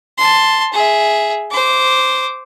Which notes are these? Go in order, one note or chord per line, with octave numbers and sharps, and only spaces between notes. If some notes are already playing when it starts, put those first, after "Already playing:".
A5 C6
G#4 E5
C5 D6